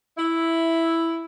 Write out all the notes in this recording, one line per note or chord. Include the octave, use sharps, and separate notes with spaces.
E4